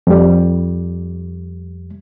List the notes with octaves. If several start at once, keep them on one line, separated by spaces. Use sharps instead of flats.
F2 G3